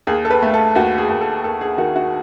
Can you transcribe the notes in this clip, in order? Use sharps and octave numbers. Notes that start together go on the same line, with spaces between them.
D#2 G#4
A4
B4
A3
A4
D#2 F#4
G#4
D#2
A4
D#2 A4
G#4
D#3 F#4
F#4